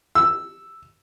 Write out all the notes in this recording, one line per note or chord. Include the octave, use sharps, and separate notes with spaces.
E6